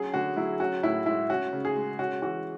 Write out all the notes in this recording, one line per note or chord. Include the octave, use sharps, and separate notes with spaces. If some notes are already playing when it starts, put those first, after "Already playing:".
Already playing: F#3 C#4 G#4
D3 F#4
F#3 E4
C#4 F#4
A2 E4
G#3 E4
C#4 F#4
C#3
G#4
G#3
C#4 F#4
E3 F#4